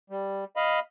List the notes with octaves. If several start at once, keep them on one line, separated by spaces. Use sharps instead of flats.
G3
D#5 F5 B5